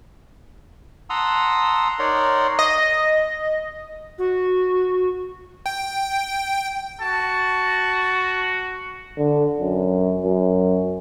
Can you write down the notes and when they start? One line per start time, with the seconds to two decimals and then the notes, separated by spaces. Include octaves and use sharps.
1.10 F#5 A5 A#5 C6 D#6 E6
1.99 D#4 A#4 C#5 D5 F#5 C6
2.59 D#5
4.18 F#4
5.66 G5
7.01 F#4 A5
9.17 D3
9.60 F#2
10.23 F#2